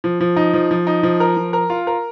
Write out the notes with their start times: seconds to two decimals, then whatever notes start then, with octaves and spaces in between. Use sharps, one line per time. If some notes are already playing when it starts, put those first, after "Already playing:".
0.04 F3
0.21 F3
0.36 D#4
0.53 F3
0.71 F3
0.87 D#4
1.03 F3
1.20 A#4
1.37 F3
1.53 A#4
1.70 F4
1.87 A#4